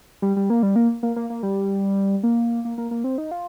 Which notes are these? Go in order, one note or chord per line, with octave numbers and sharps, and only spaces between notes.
G3
G3
A#3
G3
A#3
A#3
A#3
A#3
G3
A#3
A#3
A#3
A#3
C4
D#4
F4